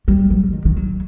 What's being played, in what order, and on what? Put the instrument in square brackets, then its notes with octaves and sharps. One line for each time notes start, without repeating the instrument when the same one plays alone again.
[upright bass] G3
F#3
D#3
D#3
F#3